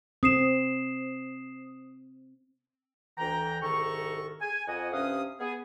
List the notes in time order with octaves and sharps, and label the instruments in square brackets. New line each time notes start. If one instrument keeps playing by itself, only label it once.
[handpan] C4 [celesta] D#6 C7 E7
[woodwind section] D2 E3 G5 A#5
C2 G#2 D#3 A4 A#5 C#6
G#5
F2 D#5 F#5 G#5
G2 C3 C#4 F5 D#6
B3 G#4